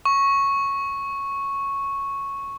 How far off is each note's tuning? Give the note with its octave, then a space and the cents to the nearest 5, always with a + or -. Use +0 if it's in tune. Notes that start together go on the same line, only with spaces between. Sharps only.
C#6 -5